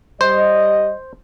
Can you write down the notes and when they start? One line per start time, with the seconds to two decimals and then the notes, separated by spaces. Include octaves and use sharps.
0.21 G3 C5 D#5